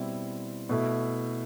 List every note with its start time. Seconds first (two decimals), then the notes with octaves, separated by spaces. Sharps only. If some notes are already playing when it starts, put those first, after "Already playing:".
Already playing: B2 G3 C4 E4
0.69 B2 A3 E4